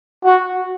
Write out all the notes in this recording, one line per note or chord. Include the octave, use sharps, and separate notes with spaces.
F#4